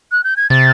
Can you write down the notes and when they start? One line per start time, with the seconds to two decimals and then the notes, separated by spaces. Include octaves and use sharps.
0.12 F#6
0.24 G6
0.37 G#6
0.50 C3 A6